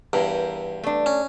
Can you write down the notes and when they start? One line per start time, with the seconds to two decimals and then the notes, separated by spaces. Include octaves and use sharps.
0.13 E2 G2 A#4
0.84 A3 D4
1.06 C#4